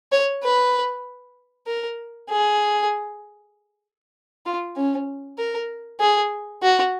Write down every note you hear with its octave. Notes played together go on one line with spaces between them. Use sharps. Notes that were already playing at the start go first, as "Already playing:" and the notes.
C#5
B4
A#4
G#4
F4
C#4
A#4
G#4
F#4